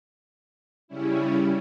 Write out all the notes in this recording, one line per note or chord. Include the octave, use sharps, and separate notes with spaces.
C#3 G3 C#4 E4